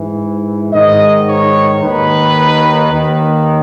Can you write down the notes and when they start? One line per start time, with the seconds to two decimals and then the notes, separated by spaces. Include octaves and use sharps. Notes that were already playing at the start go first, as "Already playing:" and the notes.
Already playing: G#2 E3
0.72 G#2 D#3 D#5
1.28 C#5
1.82 D#2 D#3 B4
2.91 D#2 D#3